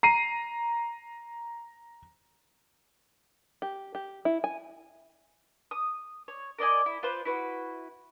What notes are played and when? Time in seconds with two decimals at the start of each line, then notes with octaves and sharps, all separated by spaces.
0.03 A#5 C7 D#7
3.62 G4
3.95 G4
4.25 E4
4.44 G#5
5.71 D#6
6.28 C#5
6.59 A#4 D5 D#5 G#5
6.86 E4
7.03 F4 B4 C5
7.25 E4 F#4 B4